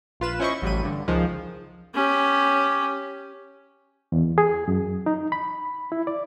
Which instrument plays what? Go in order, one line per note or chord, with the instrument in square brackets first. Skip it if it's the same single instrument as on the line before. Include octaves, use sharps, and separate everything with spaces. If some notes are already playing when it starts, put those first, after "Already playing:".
[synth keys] A#1 F4 B4 E7
C#4 E4 C5 D#5 B5 C#6
A1 F#3 G3 B5 D#7
G2 D3
C#2 D#3 F3 G#3
[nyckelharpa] C#4 G4
[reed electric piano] E2
G#4
F#2
D#4
B5
E4
D5